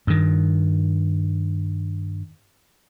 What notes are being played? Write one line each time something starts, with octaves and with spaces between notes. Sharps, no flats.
G2 D#3